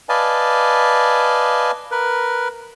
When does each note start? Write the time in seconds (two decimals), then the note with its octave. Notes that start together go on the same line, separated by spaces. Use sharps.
0.09 B4 D5 D#5 F5 G#5 A5
1.91 A#4 B4